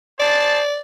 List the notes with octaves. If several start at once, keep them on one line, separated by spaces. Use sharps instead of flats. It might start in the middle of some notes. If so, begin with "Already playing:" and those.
G#4 C5 D5 A5